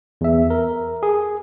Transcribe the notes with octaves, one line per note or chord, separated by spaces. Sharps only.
E2 E5
A#4
G#4